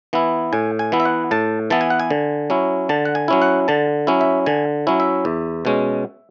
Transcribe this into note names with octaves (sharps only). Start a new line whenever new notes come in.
E3 B3 E4
A2 G#5
G#5
E3 B3 E4
E5
F#5
A2 A5
E3 B3 E4 A5
G#5
F#5
G#5
D3
F#3 C#4 E4
D3 A5
F#5
G#5
F#3 C#4 E4
F#5
D3 A5
F#3 C#4 E4
E5
D3 G#5
F#3 C#4 E4
E5
E2
B2 G#3 C#4